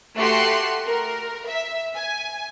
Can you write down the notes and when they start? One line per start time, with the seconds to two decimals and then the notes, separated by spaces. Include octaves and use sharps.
0.16 A3 F#4 G4 C6 F#6 C#7
0.85 A#4
1.47 E5
1.94 G#5